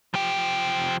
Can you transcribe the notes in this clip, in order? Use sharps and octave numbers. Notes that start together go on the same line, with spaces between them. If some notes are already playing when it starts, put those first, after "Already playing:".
F3 G4